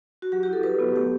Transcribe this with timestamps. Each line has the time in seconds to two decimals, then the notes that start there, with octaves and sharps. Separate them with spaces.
0.22 F#4
0.32 F#3 G4
0.43 E4 G4
0.53 A4
0.63 F#3 B4
0.79 B3
0.96 A3 G4